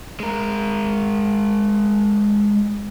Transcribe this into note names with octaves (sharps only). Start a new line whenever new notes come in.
G#3 A#4